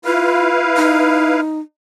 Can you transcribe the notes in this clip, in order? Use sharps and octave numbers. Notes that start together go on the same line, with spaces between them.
E4 F4 B4 F5
D#4